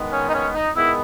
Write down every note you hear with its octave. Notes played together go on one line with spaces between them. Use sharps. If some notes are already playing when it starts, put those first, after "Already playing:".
Already playing: D#3 G#3 B3
C#4
D#4
C#4
D#4
D#3 G#3 B3 E4